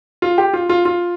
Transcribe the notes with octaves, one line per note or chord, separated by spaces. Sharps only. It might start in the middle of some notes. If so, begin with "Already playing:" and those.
F4
G4
F4
F4
F4